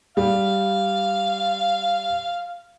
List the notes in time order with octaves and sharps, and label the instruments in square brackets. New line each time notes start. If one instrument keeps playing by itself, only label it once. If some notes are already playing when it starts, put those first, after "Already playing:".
[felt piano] G3 [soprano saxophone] F5